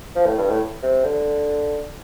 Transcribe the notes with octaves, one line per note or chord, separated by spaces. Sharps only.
F3
A2
G2
A2
C3
D3